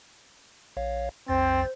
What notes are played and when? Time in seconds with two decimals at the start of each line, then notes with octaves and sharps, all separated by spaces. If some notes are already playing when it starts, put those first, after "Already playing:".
0.77 A#1 C#5 F5
1.28 B1 F2 C4 C5 A6